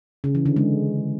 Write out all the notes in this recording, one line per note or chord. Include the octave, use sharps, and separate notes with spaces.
C#3
E3
D3
G#3